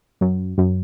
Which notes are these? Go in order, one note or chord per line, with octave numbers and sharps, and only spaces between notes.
F#2
F#2